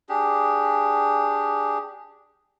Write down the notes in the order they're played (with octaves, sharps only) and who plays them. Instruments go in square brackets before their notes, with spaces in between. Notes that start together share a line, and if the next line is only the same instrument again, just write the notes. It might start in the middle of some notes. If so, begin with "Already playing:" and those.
[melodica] D4 G4 G#4